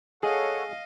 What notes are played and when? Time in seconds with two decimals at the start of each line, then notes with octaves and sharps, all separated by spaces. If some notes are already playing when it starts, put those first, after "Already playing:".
0.23 G#4 A4 C#5 D#5 F5 F#5